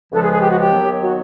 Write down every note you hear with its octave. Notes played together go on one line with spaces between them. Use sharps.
C#2 C#3 F3 G#3 B3 A4
G#4
G#4
G4
F#4
G4
D#2 D#3 F#3 B3
F#4